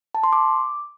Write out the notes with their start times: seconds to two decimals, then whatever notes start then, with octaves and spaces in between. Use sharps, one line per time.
0.15 A5
0.24 C6
0.33 D6